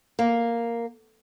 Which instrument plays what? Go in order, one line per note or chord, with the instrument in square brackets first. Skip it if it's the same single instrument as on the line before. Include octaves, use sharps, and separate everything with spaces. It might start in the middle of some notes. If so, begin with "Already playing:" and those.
[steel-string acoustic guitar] A#3